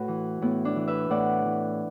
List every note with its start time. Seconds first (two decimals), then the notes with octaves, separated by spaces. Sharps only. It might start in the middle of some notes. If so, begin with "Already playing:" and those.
Already playing: A2 F#4 B4
0.08 E3
0.42 A2 B3 E4
0.65 D4
0.76 E3
0.88 B4 E5
1.10 A2 D5 F#5
1.45 E3